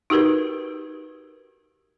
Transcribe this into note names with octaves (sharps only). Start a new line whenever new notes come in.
D#4 F#4 G4 A#4 B4